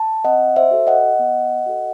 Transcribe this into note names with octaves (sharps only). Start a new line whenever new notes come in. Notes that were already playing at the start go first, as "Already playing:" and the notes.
Already playing: A5
C4 D#5 F#5
C5 E5
F#4 A4
D#5 F#5
B3
F#4 A4